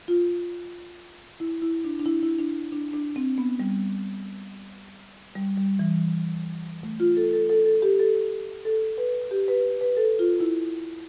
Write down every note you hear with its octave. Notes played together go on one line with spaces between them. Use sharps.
F4
E4
E4
D4
D4
E4
E4
D4
D4
D4
C4
B3
G3
G3
G3
E3
A3
F4
A4
A4
A4
A4
G4
A4
A4
B4
G4
B4
B4
A4
F4
E4